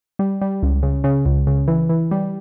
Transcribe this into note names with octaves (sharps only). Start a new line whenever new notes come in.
G3
G3
C#2
C#3
C#3
C#2
C#3
E3
E3
G3